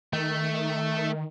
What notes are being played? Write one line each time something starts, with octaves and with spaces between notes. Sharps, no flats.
D#3 A3